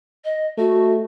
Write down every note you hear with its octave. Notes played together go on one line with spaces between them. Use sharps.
D#5
A3 F#4